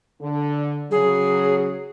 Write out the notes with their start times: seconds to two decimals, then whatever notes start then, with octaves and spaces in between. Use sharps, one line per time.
0.21 D3
0.91 C#3 F#3 G#4